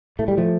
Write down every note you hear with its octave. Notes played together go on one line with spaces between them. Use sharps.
A2 A3
G3
F3 A3